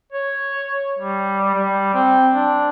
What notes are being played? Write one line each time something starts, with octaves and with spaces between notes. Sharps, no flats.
C#5
G3
G3
C4
D4